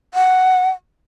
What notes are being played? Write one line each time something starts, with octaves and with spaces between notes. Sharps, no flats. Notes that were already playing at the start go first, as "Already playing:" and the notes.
F#5